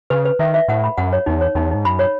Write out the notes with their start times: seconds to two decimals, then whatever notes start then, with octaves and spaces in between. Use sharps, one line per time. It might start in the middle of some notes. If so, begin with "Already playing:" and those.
0.10 C#3 B4
0.25 B4
0.39 D#3 E5
0.54 E5
0.68 A2 F#5
0.84 B5
0.97 F#2 F#5
1.13 C#5
1.26 E2 D#4
1.41 C#5
1.55 E2 D#4
1.71 G#2 D#4
1.85 F#2 B5
1.99 C#5